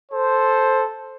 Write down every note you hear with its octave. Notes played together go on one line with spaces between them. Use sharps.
A4 C5